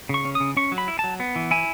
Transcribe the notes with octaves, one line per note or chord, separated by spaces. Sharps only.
C#3 C#6
C#4
C#3 D#6
C#4 C#6
F#3
B5
E4
F#3 A5
B3
E3
E4 G#5